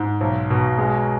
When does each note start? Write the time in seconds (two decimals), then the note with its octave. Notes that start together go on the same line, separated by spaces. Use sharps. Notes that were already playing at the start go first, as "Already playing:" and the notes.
Already playing: G#2
0.21 B1
0.50 B2
0.78 G#3